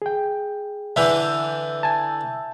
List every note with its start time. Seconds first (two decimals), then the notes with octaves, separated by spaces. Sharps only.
0.02 G#4 G5
0.96 D3 E3 E5 E6 G6
1.83 G#5 A5